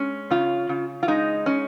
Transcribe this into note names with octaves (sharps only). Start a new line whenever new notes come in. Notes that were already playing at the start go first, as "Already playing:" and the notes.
Already playing: G#3 C#4
C#3 F4
C#3
F4
G#3 D#4
C#4